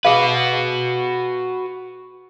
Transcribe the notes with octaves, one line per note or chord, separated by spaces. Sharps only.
F#4 G#4 B4 F5